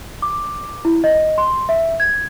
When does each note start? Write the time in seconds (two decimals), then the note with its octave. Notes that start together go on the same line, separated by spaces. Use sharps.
0.22 D6
0.85 E4
1.04 D#5
1.38 C6
1.69 E5
2.00 G#6